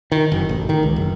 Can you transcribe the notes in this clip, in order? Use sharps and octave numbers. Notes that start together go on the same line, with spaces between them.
D#3
F#1
A1
D#3
C#2
F#1